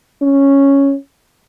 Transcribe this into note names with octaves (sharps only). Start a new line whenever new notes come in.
C#4